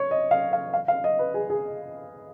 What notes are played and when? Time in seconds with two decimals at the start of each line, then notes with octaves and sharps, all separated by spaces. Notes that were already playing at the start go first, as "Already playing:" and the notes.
Already playing: C#5
0.11 D#5
0.31 F5
0.53 F5
0.73 F5
0.88 F5
1.04 D#5
1.19 B4
1.34 G#4
1.50 G#4